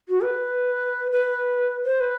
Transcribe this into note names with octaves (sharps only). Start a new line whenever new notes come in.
F#4
B4
B4
C5
B4